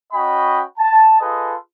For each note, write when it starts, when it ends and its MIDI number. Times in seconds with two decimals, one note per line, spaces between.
0.13 0.62 61
0.13 0.62 66
0.13 0.62 75
0.13 0.62 79
0.13 0.62 83
0.78 1.19 81
1.20 1.54 65
1.20 1.54 68
1.20 1.54 69
1.20 1.54 71
1.20 1.54 75